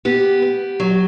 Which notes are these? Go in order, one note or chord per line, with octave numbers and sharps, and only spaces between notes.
B3 G4
B3
F#3